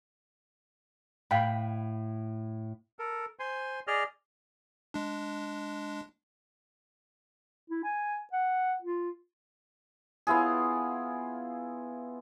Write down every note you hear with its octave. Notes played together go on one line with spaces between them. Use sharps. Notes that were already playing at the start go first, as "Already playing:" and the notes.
A2 F5 G5 B5
A4 A#4
C5 G#5 C6
G#4 D5 D#5 F6
G#3 D4
E4
G#5
F#5
F4
B3 E4 F4 G#4